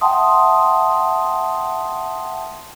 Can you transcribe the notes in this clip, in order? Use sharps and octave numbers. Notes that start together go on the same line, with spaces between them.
E5 F#5 G5 A5 C6 D#6